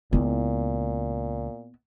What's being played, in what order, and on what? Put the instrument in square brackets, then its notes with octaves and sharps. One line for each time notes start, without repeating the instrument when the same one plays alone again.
[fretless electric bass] C#2 [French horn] A#2 [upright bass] B3 E4